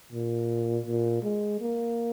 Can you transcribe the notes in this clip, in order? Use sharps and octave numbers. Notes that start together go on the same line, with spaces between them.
A#2
A#2
G#3
A#3